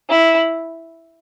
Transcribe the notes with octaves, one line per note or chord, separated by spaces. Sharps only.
E4